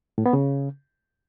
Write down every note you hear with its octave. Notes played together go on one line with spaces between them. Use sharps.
A2
B3
C#3